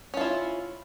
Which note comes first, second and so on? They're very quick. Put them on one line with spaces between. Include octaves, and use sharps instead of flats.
C#4 F4 E4